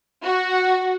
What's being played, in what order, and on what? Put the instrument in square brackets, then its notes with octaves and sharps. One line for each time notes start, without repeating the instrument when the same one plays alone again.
[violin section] F#4